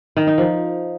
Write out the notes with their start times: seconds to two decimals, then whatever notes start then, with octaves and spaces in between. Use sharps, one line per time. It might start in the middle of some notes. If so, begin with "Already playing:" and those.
0.17 D#3
0.27 D#4
0.38 F3